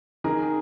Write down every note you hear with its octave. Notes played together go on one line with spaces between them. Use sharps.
D#3 G#4 A#4